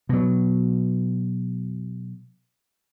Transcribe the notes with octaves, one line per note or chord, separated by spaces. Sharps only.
B2 F#3